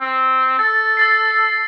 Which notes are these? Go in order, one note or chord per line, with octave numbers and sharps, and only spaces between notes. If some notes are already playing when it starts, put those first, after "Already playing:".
C4
A4 A6
E6 A6 C7